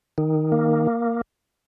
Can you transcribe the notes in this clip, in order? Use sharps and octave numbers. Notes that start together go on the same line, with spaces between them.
D#3
A#3